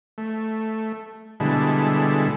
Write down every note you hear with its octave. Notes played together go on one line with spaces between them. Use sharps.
A3
B2 D3 G3 G#3 E4 A4